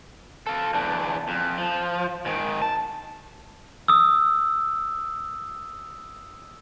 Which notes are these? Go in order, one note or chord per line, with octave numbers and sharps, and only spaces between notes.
A4 F5
E2 D4
F2
F3
G#2 D#3
A5
D#6 E6